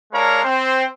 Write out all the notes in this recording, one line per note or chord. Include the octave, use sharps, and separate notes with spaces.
G#3 D4 A#4 C#5 F5 A#5
C4 C5